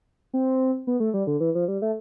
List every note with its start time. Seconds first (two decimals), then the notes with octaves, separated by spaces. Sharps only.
0.33 C4
0.87 B3
1.00 A3
1.14 G3
1.27 D3
1.40 E3
1.55 F3
1.68 G3
1.82 A3